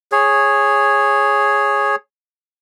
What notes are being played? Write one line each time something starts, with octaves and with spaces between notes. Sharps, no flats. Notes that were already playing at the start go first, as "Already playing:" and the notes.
G#4 C#5